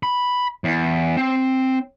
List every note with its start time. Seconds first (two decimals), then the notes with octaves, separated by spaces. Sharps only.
0.03 B5
0.64 E2
1.17 C4